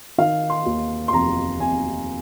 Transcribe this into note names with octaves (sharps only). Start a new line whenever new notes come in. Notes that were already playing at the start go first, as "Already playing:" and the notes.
D#3 F5
C6
D#2
C6
F1 A#5
F1 G#5